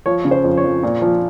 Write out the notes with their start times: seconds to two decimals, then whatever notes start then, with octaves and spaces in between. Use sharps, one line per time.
0.06 F3 C#5
0.25 C#3
0.31 C5
0.44 F2
0.57 C#5
0.64 F2
0.83 A#2
1.02 F3